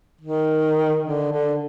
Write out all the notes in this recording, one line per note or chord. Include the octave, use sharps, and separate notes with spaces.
D#3
D3
D3